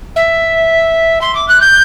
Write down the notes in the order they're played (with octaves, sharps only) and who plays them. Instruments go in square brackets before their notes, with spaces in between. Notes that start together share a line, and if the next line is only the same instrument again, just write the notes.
[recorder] E5
C6
D6
F#6
G6